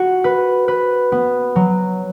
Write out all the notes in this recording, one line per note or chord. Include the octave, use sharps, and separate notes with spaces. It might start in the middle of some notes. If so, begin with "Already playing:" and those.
Already playing: F#4
B4
B4
B3
F#3